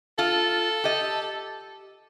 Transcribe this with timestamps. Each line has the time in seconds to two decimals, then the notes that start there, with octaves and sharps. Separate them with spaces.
0.19 F4 A4
0.84 G4 D#5